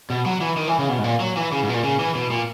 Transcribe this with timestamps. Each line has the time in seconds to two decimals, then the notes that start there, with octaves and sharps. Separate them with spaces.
0.10 B2
0.26 F#3
0.41 E3
0.57 D#3
0.67 E3
0.79 C#3
0.89 B2
0.99 G#2
1.04 A#2
1.20 F#3
1.37 E3
1.52 C#3
1.63 G#2
1.69 B2
1.74 A#2
1.84 C#3
1.99 E3
2.15 B2
2.31 A#2